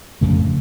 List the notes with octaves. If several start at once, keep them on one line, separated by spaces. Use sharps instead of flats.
F2 C#3 F3 A3